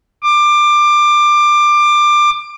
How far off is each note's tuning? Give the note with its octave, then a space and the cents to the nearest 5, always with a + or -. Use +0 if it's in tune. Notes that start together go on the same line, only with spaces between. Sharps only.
D6 +20